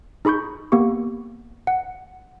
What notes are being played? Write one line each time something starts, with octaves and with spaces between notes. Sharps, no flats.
D#4 G#4 B5 C#6 G6
A#3 B3 G4 C#6
F#5